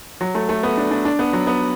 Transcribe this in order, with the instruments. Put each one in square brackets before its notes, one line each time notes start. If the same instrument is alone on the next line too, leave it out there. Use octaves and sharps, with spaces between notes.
[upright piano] F#3
A3
A3
B3
D4
D4
D4
B3
F#3
B3